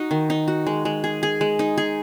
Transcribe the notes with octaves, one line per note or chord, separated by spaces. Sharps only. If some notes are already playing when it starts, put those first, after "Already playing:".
Already playing: D#4 F#4
D#3
D#4
F#4
G#3
G#3
G#4
G#4
G#3
D#4
G#4